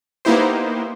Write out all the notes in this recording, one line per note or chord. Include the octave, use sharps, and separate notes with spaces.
A#3 B3 D#4 E4 G4 C5